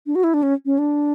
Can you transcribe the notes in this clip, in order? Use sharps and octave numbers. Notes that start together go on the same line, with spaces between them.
D4
F#4
E4
D4
C#4
C#4
D4